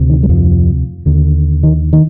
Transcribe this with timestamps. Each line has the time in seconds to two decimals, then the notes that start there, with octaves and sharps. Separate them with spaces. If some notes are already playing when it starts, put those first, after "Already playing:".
Already playing: D2 C3
0.10 D#3
0.23 G3
0.29 F2 F3
1.06 D#2 D3
1.63 D#3
1.93 D#3